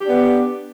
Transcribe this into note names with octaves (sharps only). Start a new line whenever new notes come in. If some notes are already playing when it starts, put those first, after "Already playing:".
B3 D4 G4